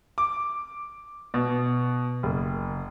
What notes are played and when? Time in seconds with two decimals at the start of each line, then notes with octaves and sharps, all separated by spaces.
0.18 D6
1.34 B2
2.23 F#1